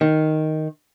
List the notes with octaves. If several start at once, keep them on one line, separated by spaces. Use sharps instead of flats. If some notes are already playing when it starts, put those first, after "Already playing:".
D#3